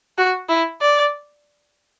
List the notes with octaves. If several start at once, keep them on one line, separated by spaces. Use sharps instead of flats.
F#4
E4
D5